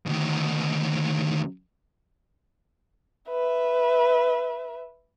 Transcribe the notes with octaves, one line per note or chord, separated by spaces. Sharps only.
D2 D#3
B4 E5